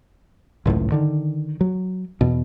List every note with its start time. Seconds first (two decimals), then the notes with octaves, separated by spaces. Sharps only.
0.66 G#1 C#2 F#2 A2
0.92 D3 D#3
1.61 F#3
2.21 E2 B2